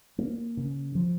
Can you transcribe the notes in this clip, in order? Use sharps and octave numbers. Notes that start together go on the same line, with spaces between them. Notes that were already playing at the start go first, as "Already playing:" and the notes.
A#3
C#3
F3